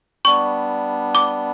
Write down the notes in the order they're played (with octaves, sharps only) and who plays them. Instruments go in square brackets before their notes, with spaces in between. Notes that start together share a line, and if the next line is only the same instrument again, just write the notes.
[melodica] G3 B3 D4 [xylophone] C#6
[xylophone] D6